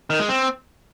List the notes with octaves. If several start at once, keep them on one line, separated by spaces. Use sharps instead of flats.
D#3
G#3
C4